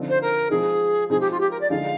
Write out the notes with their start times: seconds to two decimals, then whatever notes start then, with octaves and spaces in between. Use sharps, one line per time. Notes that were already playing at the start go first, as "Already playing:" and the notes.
Already playing: D3 F3 C4 D#4
0.09 C5
0.21 A#4
0.50 F3 G#3 C4 D#4 G#4
1.10 F3 G#3 C4 D#4 G#4
1.20 G4
1.30 F4
1.40 G4
1.50 A#4
1.61 D5
1.70 D3 F3 G#3 D#4 F5